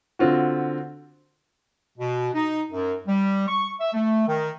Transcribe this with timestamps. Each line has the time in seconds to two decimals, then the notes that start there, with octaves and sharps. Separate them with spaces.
0.19 D3 C4 F4 F#4
1.98 B2
2.34 D#4
2.72 F#2
3.07 G3
3.48 C#6
3.80 E5
3.93 A3
4.27 D#3